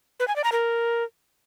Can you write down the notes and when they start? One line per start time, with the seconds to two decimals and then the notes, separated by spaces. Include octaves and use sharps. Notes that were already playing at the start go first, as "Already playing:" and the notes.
0.20 B4
0.28 G#5
0.36 D5
0.44 A#5
0.52 A#4